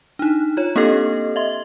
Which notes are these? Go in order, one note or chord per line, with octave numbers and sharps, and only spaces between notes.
D4 D#4
F4 C#5
A#3 C4 D4 G4 A4 D#5
D#5 E5 C6